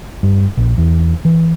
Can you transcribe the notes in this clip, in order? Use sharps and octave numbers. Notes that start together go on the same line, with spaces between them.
G2
A#1
E2
E3